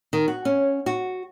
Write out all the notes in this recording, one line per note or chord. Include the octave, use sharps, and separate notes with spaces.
D#3
F#4
C#4
F#4